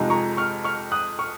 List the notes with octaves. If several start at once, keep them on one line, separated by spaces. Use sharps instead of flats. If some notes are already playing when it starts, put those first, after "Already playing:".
Already playing: F2 C3 F3 G#3 D#4
A#5 C#6
C#6 F6
C#6 F6
D#6 F#6
C#6 F6